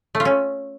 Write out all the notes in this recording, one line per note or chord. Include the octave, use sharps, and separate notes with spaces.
A3
F4
C#4